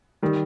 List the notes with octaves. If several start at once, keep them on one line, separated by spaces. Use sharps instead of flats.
D#3 G3